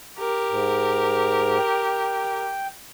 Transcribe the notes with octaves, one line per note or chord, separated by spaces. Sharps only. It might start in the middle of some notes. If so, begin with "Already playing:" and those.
G4 A#4
G#2
G5